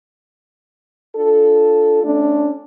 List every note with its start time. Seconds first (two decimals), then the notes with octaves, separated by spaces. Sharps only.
1.16 D4 F4 A4
2.04 A3 C#4 D4